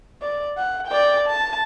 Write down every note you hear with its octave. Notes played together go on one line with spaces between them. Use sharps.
D5
F#5
D5 G5
A5